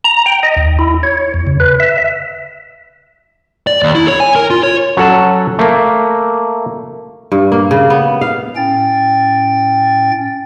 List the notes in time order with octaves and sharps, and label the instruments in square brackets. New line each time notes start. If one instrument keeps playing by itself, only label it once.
[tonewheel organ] A#5
G5
D#5
D#2
E4
C#5
E2
C#3
B4
E5
E5
[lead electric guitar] D5
D#2
E4
C#5
G#5
A#4
F4
C#5
[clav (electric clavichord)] F#3 C#4 A4 F#5 A5
A3 A#3
[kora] G2
A#3
C#3
B3
F5
[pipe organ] A2 C#4 G5 A6